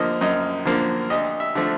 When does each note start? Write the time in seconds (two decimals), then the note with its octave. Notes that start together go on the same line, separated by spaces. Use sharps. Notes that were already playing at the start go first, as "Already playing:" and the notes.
Already playing: D3 F3 A#3 D#5
0.21 F#2 D#5
0.65 D3 F3 A#3
1.10 D2 D#5
1.40 E5
1.55 D3 F3 A3